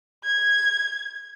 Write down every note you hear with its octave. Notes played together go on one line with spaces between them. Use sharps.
G#6